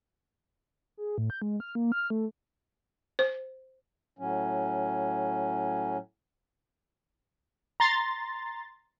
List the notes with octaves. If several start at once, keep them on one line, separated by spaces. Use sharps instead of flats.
G#4
A2
G6
G#3
F6
A#3
F6
A3
C5
A2 F#3 C#4
A#5 C6 A6